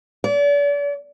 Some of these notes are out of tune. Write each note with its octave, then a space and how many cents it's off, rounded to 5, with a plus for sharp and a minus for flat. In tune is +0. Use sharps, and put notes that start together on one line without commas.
D5 -40